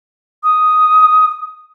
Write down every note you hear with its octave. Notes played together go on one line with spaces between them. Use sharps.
D#6